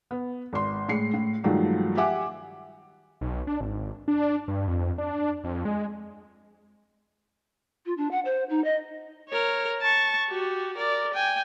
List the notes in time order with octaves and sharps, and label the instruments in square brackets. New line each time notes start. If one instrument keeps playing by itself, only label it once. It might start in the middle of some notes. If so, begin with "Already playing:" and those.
[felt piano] B3
G#1 C6
A2 G#3 C7 C#7
A2
G2 D#3 F3 F#3 G#3 A3
G4 E5 F#5 G#5 D6
[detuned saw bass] B1
D4
G#1
D4
G2
F2
D4
F2
G#3
[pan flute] F4
D4
F#5
C5
D#4
D#5
[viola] A#4 C#5
A5 C#6
F#4 G4
A#4 D5
G5 G#5